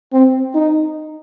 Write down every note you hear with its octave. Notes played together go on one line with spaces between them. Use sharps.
C4
D#4